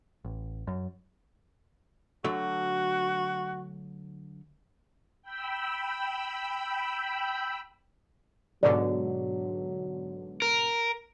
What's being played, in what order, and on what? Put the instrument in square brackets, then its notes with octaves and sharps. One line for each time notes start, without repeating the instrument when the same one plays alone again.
[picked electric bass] A1
F#2
[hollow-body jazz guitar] D3 F#3 A3 [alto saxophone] F#4
[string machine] G5 B5 E6
[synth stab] G#2 B2 D3 [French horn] F#3 [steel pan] D5
[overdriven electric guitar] A#4